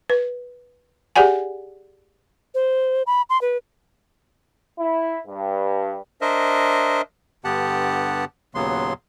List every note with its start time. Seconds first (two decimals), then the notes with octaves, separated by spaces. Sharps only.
0.10 B4
1.16 G4 G#4 D5 F#5 G#5
2.55 C5
3.07 B5
3.30 C6
3.41 B4
4.77 E4
5.27 G2
6.21 D4 A#4 C5 D#5 E5
7.44 G2 D3 B3 G4 F#5 A5
8.55 D#2 A#2 C#3 F#3 B3 C6